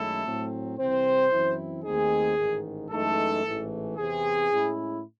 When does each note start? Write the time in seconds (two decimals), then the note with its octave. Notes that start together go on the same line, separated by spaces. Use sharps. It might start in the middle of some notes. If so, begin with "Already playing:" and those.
Already playing: F#2 D#3 G#3 A3 C#4 E4 A4
0.25 A2 F#3 C4
0.78 C2 C3 E3 C4 C5
1.32 F#2 E3 C4 E4
1.84 D#2 D#3 A3 C4 D#4 G#4
2.37 A1 G#2 D#3
2.91 F#2 E3 G#3 A3 D#4 A4
3.44 A1 G#2 E3 A3
3.97 E2 C3 E3 C4 G#4
4.50 A2 G#3 C#4 E4